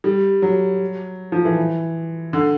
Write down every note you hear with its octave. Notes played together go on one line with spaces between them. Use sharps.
G3
F#3
F3
E3
D3